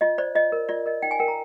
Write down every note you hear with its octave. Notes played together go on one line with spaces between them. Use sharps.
F4 D#5
C5 D5
F4 D#5
A#4
F4 D5
A#4 D#5
D#4 G5
G#5
A#4 G5
A#5